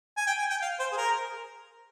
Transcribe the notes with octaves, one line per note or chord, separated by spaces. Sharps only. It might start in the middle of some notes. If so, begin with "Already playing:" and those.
G#5
G5
G#5
G5
F5
C5
G#4
A#4